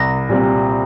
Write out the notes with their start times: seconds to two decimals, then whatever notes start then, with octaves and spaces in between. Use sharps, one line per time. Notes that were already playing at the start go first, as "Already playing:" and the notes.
Already playing: C2 A#6
0.29 A#2 G3 C4